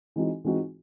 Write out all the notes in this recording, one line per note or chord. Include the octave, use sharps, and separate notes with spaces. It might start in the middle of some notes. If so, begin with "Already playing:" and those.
E3 G#3 C4 D#4 F#4
E3 G#3 C4 D#4 F#4